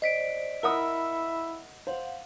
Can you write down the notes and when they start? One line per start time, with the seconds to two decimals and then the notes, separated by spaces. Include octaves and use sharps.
0.02 C5 D5 D#5 B6 D7
0.63 E4 A#4 E5 F#5 B5 D#6
1.87 C5 F5 F#5